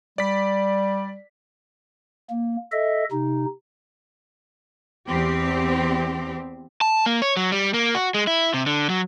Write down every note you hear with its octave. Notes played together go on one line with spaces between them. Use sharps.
G3 D5 B6
A#3
A4 D#5 E5
C3 D#4
E2 C4 G4
A5
A#3
C#5
F#3
G3
A#3
F#4
G#3
E4
C3
D3
F#3